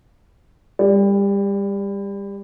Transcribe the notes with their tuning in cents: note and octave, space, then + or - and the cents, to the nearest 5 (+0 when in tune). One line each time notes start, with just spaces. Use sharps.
G3 +30 D5 -5